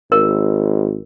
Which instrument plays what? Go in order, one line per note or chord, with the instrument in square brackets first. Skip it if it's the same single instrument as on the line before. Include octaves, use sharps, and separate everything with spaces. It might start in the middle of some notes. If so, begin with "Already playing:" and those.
[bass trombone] G#1 [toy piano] A#4